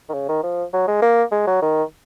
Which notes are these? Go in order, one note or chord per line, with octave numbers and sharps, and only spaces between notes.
D#3
C#3
D#3
F3
F#3
G#3
A#3
G#3
F#3
D#3